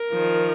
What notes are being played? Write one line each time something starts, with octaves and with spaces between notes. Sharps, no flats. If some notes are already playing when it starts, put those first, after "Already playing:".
Already playing: A#4
D#3 F3